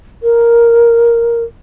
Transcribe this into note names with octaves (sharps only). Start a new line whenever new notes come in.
A#4